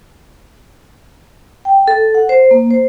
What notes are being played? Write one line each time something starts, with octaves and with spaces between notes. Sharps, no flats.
G5
A4
F#5
C5
A#3
C5